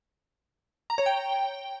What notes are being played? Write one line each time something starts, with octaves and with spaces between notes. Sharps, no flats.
A#5
C#5
G5